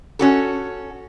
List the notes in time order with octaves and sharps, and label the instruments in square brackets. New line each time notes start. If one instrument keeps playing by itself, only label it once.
[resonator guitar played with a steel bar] C#4 F#4 A4